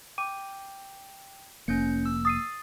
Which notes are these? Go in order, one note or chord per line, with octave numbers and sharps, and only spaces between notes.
G5 D6 D#7
F1 A#3 C#4 G6 C#7
E6
D#6 A6 C7 D#7